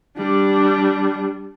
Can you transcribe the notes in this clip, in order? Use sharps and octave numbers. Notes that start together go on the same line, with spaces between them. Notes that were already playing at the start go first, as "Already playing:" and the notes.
G3 D4